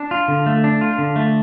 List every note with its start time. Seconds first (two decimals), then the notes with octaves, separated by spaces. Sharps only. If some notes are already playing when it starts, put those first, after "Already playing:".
Already playing: D4
0.11 F4
0.28 D3
0.46 A3
0.64 D4
0.81 F4
0.98 D3
1.16 A3